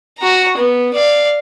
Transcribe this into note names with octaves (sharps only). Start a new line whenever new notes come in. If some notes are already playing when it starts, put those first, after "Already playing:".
F#4 A#5
B3
D5 F5